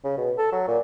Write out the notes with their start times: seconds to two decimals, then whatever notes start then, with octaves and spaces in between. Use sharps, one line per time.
0.04 C#3
0.17 B2
0.38 A4
0.52 F#3
0.68 A#2